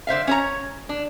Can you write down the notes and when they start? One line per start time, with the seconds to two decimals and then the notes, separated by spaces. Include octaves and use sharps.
0.07 D3 C5 E5 F5
0.27 C#4 C#5 A#5
0.89 D4